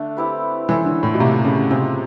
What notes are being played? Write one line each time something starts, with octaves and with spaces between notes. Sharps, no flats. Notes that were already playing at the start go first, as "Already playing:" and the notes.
Already playing: D3 A3 D4
C4 E4 G4 B4
E3 C#4 E4 A4 C5
D3
A2
B2
C3 A#3 D4 G4
C#3
C3 G#3 C4 F4